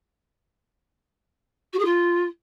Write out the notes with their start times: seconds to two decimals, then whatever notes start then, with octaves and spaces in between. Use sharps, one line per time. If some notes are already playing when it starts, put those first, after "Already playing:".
1.73 F#4
1.79 G#4
1.85 F4